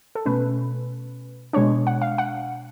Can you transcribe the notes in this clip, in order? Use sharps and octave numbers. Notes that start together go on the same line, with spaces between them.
A4
B2 A3 C#4 B4
B2 G#3 D4 C#5
F#5
F5
F#5